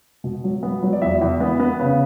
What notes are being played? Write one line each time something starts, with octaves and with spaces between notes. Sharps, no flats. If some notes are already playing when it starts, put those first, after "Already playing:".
B2
F#3
B3
F#3
D5
E2 E5
E2
B3
B3
C#3